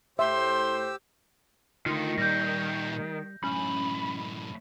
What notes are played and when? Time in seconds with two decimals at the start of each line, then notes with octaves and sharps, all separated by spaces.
0.19 A2 G4 C5 E5 C6 E6
1.86 D3 D#3 A3 F4
2.18 A#2 G3 G4 G6 A#6
3.44 F#2 A2 C#4 B5